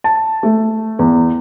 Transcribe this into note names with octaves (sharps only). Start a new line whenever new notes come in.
A5
A3
E2